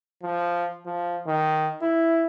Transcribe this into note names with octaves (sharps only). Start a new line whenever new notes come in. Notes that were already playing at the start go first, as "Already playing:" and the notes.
F3
F3
D#3
E4